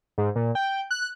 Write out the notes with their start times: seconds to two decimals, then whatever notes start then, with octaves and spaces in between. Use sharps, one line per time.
0.18 G#2
0.36 A#2
0.55 G5
0.91 F#6